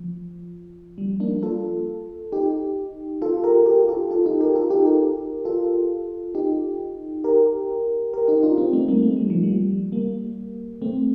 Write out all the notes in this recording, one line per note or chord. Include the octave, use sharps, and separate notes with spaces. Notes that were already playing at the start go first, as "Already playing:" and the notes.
Already playing: F3
G3
A#3 D4
F4 A4
D#4 G4
F4 A4
G4 A#4
G4 A#4
F4 A4
F4 A4
D#4 G4
G4 A#4
F4 A4
D#4 G4
G4 A#4
F4 A4
D#4 G4
G4 A#4
G4 A#4
D#4 G4
D4 F4
C4 D#4
A3 C4
G3 A#3
A3
G3
F3
G3
G3 A#3
A3 C4